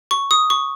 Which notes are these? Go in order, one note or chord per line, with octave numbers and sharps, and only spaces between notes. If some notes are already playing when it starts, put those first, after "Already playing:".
C#6
D#6
C#6